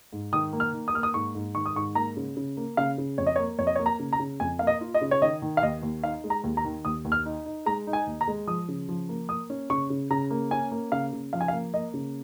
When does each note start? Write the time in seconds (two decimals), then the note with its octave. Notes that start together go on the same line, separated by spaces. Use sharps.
0.13 G#2
0.33 D#3 D#6
0.53 A#3
0.60 F6
0.73 D#3
0.88 D#6
0.94 A#3 F6
1.03 D#6
1.14 G#2 C#6
1.35 G#2
1.55 D#3 C#6
1.66 D#6
1.76 G#2 C#6
1.95 A#3 A#5
2.17 C#3
2.37 C#3
2.57 A#3
2.77 C#3 F5
2.98 C#3
3.18 F2 C#5
3.27 D#5
3.36 C#5
3.39 A#3
3.59 F2 C#5
3.67 D#5
3.76 C#5
3.79 A#3
3.86 A#5
3.99 C#3
4.13 A#5
4.20 C#3
4.40 F2 G#5
4.59 A#3 F5
4.67 D#5
4.81 F4
4.94 D#5
5.01 C#3
5.11 C#5
5.22 D#3 D#5
5.42 D#3
5.57 F5
5.62 D#2 D#5
5.82 D#2
6.04 D#4 F5
6.24 G#3
6.30 A#5
6.44 D#2
6.57 A#5
6.64 D#3
6.85 D#2 D#6
7.05 D#2
7.12 F6
7.26 D#4
7.46 D#4
7.66 G#3 A#5
7.87 D#4
7.93 G#5
8.07 D#2
8.21 A#5
8.28 G#3
8.47 F3 D#6
8.68 C#3
8.89 F3
9.09 A#3
9.29 A#3 D#6
9.50 C#4
9.70 C#3 C#6
9.90 C#3
10.10 C#3 A#5
10.30 A#3
10.51 C#4 G#5
10.71 A#3
10.92 C#3 F5
11.13 C#3
11.33 F3 F5
11.41 G#5
11.48 F5
11.53 A#3
11.74 A#3 D#5
11.94 C#3